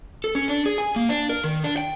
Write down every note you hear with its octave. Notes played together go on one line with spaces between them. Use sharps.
A4
C#4
D4
G#4
G#5
A#3
D4
A#4
D#3
D4
G5